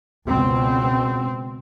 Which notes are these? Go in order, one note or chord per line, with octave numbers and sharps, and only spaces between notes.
C#2 B2 C4